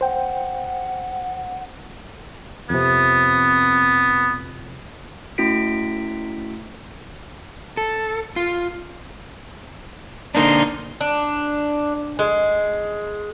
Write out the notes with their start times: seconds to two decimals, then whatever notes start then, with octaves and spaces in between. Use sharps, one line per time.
0.01 C5 F#5 G5
2.70 F2 C3 B3
5.38 A3 C#4 E4 F#4 B6 D7
7.77 A4
8.36 F4
10.35 D3 A#3 D4 D#4 C6
11.01 D4
12.19 G#3